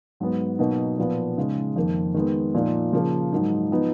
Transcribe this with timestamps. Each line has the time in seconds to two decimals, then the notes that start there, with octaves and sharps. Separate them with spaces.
0.20 G#2 F#3 B3
0.59 B2 F#3 A#3 D#4
0.98 A#2 F3 B3
1.37 C#3 G#3 D#4
1.76 F2 D#3 A#3
2.14 D#3 G#3 B3
2.54 A#2 F3 A#3 D#4
2.93 C#3 F3 A#3
3.32 G#2 F#3 A#3 D#4
3.71 F3 B3 D#4